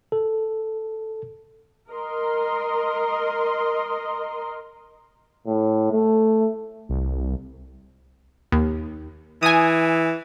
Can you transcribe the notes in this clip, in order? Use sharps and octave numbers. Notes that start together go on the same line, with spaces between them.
A4
A#4 D#5 C6
A2
A3
C2
D#2
E3 G#5 D#6